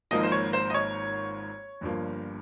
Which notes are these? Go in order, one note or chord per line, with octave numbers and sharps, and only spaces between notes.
G#1 G#2 F3 A#3 D#5
C5
C#5
C5
D#5
C#5
G1 G2 F3 A#3